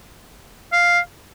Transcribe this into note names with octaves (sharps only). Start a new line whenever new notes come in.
F5